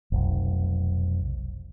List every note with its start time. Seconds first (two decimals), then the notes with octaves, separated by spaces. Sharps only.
0.12 F1 B1